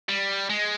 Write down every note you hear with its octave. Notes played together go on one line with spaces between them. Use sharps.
G3
G#3